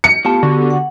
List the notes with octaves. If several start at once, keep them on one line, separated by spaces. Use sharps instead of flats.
C#7
A2 B3 F4 G4 A5
D3 F#4
F#5